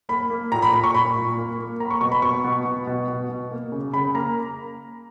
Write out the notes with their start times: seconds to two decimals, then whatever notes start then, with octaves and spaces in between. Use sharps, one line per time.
0.09 A#3 B5
0.30 A#3
0.52 A#2 A#5
0.62 B5
0.73 A#2 B5
0.84 C#6
0.94 A#2 B5
1.16 A#2
1.37 A#3
1.58 A#3
1.80 A#3 A#5
1.86 B5
1.91 C#6
2.01 B2 C#6
2.12 B5
2.22 B2 C#6
2.44 B2
2.65 B2
2.87 B2
3.08 B2
3.29 B2
3.51 A#3
3.72 C#3
3.93 C#3 B5
4.15 A#3 A#5